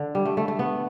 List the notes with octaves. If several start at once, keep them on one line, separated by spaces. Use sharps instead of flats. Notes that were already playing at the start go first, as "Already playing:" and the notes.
Already playing: D3
G3
A3
A3
A3
B3